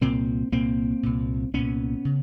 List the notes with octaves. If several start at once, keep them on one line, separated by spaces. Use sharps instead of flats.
C2 A#2 A#3 C4
C2 A#2 A#3 C4
C2 A#2
C2 A#2 B3 C#4
C#3